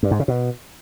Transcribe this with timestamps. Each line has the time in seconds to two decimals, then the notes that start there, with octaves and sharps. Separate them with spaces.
0.03 G2
0.11 G#2
0.20 C#3
0.28 B2